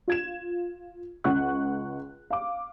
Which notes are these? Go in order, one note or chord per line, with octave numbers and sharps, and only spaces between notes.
F4 G#6 E7
C#2 F#5 C#6 F#6
F5 D6